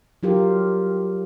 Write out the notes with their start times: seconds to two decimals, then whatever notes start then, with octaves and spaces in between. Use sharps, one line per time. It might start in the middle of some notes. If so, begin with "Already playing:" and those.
0.23 F#3 F4 G4 A#4